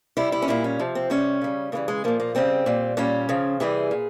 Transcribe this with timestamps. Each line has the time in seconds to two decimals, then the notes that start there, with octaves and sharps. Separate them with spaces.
0.17 C3 G3 E4
0.32 E4
0.42 C#4
0.48 A#2 G3 E4
0.64 C#4
0.79 C3 F3
0.95 C4
1.10 C3 G3 C#4
1.41 C#3 G3
1.72 C#3 E3 G3 A#3
1.88 G#3
2.04 A#2 F3 A#3
2.20 A#3
2.35 C#3 G3 C4
2.66 A#2 G3
2.97 A#2 G3 C#4
3.29 C#3 F3
3.60 C3 E3 G3 G#4
3.91 A#2